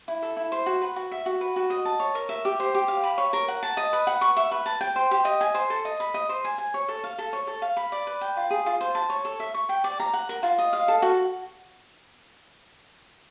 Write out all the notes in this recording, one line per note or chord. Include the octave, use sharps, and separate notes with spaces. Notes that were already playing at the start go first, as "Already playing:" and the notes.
E4
A4
E4
C5
F#4
B4
F#4
E5
F#4
B4
F#4
D#5
A5
C#5
A#4
E5
G4
C5
G4
F5
B5
C#5
A#4
F#5
A5
D#5
B4
F#5
C#6
E5
B4
A5
G5
C5
G4
D#5
G#5
C5
A4
D#5
B5
D#5
C5
G#5
G#5
C#5
A4
F5
A4
C#5
A4
F5
B5
D5
B4
G5
F4
G#4
F4
C5
A5
C#5
A4
E5
C#6
G5
D5
A#5
F#5
A#4
F4
D#5
F5
A4
F#4